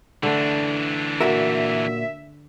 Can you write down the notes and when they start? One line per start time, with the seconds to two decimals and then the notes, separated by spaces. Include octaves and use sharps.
0.23 D3 E3 A3 D4
1.20 A#2 F#4 A#4 E5